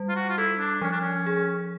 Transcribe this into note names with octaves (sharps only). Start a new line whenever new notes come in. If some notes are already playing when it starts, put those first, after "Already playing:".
Already playing: G3
F4
F#4
F4
E4 A4
D4
F3 C#4
D4
C#4
G#4